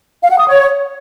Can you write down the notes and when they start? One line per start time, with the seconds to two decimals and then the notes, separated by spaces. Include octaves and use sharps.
0.22 F5
0.30 F#5
0.39 D#6
0.47 C#5